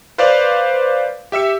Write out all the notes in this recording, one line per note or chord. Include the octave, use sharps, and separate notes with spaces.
B4 C5 D5 F5 D6
G4 E5 E6 C#7